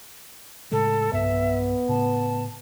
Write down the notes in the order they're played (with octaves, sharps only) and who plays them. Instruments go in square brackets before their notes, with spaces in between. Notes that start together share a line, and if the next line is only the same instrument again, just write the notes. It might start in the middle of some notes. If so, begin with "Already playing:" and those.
[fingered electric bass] A2 C#3 G#3 [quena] A4
[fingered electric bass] B1 G2 [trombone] B3 [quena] E5
[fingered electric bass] A2 C#3 [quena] A5